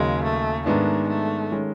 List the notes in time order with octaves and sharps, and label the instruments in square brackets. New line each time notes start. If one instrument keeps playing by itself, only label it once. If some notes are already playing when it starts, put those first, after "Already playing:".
Already playing: [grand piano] D#2 C#3 F#3 [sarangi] G#3
[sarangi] A3
[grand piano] G#2 D#3 G#3 B3 D4 [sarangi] A3
[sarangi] A3
[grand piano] D#3 G#3 C#4